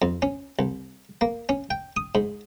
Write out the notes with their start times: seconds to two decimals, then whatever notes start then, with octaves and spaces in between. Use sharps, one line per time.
0.02 F2
0.22 C#4
0.59 C2
1.21 A#3
1.49 C#4
1.70 G5
1.96 D#6
2.15 G#2